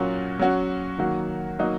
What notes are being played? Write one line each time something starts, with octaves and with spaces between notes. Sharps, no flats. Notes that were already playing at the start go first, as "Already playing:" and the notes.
Already playing: A#2 F#3 A#3 C#4 F#4
F#3 C#4 F#4
D#3 F#3 A#3 F#4
F#3 A#3 D#4 F#4